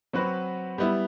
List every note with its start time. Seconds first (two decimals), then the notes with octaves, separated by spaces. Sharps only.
0.13 F#3 C4 F#4 B4
0.78 G3 B3 E4